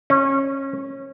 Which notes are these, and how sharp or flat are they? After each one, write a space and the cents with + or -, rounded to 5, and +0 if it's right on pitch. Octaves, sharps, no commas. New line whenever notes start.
C#4 -25